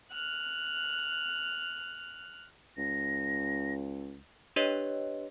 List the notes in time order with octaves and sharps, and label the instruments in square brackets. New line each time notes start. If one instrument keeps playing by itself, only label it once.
[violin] F6 F#6
[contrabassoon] C#2 [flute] A#6
[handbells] D4 G4 B4 C#5 D#5